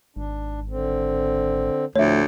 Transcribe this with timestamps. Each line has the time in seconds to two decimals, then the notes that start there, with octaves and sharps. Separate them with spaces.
0.16 G#1 D4
0.69 D3 C4
1.96 D2 A2 F3 A3 C#5 E5